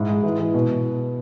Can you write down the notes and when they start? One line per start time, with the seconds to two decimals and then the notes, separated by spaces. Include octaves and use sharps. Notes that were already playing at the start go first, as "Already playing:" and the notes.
Already playing: G#2 E4
0.09 G#3
0.23 E3
0.40 E3
0.54 B2